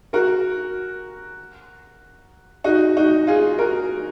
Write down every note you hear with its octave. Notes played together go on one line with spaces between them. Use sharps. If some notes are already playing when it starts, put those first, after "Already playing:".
F#4 A#4
D#4 F#4
D#4 F#4
F4 G#4
F#4 A#4